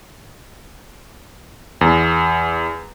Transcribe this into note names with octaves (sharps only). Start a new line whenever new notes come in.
E2